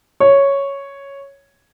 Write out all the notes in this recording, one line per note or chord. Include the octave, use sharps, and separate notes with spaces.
C#5